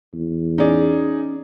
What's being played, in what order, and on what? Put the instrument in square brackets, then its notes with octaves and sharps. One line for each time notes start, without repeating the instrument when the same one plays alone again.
[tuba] E2
[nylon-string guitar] C#4 D5 [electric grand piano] D#4 G#4